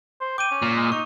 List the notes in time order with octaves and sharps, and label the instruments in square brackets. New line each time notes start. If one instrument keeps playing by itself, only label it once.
[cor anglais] C5
[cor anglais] G5 [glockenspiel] D6 D#7
[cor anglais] C#4
[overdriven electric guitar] A#2
[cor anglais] G#3
[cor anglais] D#4 [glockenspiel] C#6